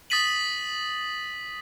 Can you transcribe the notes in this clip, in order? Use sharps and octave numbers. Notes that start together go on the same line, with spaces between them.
D#6 A6 B6 D#7 F#7